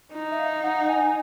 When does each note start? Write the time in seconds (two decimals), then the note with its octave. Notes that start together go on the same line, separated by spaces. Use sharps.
0.13 D#4
0.30 E5
0.39 F5
0.63 F#5
0.89 G#5